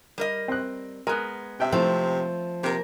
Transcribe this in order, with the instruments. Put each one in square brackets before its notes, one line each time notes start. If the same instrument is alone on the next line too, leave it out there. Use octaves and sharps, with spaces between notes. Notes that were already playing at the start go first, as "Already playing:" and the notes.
[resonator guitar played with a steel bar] G3 A#4 D#5
[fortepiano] C4 F#6
[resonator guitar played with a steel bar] G#3 B3 [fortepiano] A#4
[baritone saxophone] C3 [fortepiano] E5 G5
[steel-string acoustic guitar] F3 [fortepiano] A3 C4 E4
[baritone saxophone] C3 [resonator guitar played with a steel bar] A#3 A#4